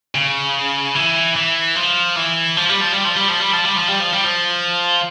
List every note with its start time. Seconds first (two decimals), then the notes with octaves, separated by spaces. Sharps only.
0.15 C#3
0.95 E3
1.36 E3
1.76 F3
2.16 E3
2.57 F3
2.69 G3
2.81 F3
2.92 G3
3.05 F3
3.16 G3
3.29 F3
3.41 G3
3.53 F3
3.65 G3
3.77 F3
3.88 G3
4.00 F3
4.13 G3
4.25 F3